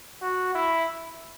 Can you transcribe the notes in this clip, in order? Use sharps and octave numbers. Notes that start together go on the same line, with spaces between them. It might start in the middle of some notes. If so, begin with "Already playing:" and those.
F#4
E4